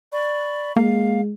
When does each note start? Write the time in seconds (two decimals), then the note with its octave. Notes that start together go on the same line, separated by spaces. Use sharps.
0.11 D5 B5 C#6
0.76 G#3 A#3 F5